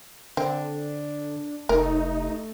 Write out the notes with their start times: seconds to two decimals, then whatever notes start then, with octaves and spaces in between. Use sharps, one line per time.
0.37 D3 C4 D4
1.69 F1 A3 D#4 A#4